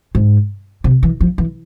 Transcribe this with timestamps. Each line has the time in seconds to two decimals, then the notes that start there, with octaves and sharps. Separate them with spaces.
0.15 G#2
0.84 C3
1.03 E3
1.21 F3
1.38 E3